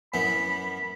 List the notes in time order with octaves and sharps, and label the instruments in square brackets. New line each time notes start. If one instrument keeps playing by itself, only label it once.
[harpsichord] F#2 E3 B3 [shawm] B5